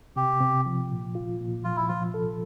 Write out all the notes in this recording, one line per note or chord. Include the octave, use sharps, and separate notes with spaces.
C3 G4
C3
F3
A#2
F4
A#2
F3 F4
E4
F3 F4
A4